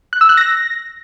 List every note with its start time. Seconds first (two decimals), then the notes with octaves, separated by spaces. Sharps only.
0.13 F#6
0.21 E6
0.29 F#6
0.37 A#6